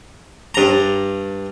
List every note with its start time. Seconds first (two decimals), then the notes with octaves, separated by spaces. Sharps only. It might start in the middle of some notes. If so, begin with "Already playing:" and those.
0.55 G2 A#5